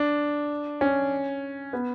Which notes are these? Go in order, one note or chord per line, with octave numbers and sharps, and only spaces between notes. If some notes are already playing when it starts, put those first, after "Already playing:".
Already playing: D4
C#4
B3